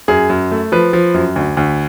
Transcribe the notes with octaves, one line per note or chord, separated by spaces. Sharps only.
F#2 G#4
F#2
A3
F3 B4
F3
F#2
D2
D2